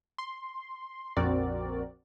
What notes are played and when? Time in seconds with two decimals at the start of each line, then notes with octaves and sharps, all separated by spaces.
0.18 C6
1.17 A#1 F2 C4 F#4 A#4 D5